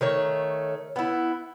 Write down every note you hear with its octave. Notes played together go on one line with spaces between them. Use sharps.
D#3 A3 C#5
B3 E4